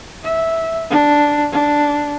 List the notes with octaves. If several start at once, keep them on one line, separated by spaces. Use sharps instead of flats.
E5
D4
D4